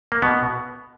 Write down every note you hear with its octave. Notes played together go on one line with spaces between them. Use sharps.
A#3
B2 B3